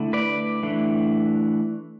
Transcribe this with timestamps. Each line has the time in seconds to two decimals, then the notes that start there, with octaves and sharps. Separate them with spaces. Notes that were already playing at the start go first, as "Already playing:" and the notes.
Already playing: D3 A3 E4
0.13 B4 D5
0.63 E3 A3 D4